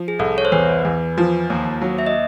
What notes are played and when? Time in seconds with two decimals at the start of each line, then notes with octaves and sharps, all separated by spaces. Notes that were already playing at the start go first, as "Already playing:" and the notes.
Already playing: F3
0.08 G#4
0.19 C2 A4
0.38 C#5
0.45 C5
0.52 E2 B4
0.85 E2
1.18 F3
1.50 D#2
1.81 F#3
1.99 E5
2.06 D#5